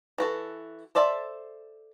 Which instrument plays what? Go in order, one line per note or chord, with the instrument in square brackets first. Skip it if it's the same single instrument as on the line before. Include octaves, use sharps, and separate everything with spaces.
[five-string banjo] E3 F#4 A4
A4 C5 D5 E5 A5